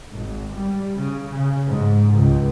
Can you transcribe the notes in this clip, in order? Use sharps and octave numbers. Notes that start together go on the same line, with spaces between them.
G#1
G3
C#3
C#3
G#2
C#2